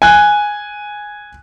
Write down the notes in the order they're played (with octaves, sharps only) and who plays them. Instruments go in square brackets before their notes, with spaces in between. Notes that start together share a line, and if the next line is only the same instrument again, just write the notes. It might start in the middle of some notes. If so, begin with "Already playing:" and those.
[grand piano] G#5 F#6